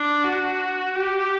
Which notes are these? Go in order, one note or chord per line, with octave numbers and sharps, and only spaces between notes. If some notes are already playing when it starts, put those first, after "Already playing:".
Already playing: D4
F#4
G4